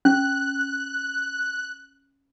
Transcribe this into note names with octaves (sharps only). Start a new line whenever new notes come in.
C#4 F#6